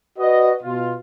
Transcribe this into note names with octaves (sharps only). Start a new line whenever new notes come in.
F#4 B4 D5 D#5
B2 F4